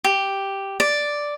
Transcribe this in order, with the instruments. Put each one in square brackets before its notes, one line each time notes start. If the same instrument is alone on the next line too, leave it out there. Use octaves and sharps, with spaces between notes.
[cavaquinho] G4
D5